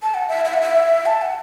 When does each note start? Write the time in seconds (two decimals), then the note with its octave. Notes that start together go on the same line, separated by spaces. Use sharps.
0.02 A5
0.14 F#5
0.28 E5
0.45 E5
0.53 F#5
0.62 E5
1.06 A5
1.22 F#5